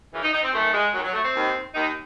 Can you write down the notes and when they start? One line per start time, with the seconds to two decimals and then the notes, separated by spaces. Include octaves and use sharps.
0.12 F#2 C#3 E3
0.23 D#4
0.33 D#4
0.43 C4
0.52 F#2 D#3 A3
0.73 G#3
0.93 F#2 D#3 F#3
1.03 F#3
1.14 A3
1.23 C4
1.35 D#2 D#3
1.74 D#2 D#3 D#4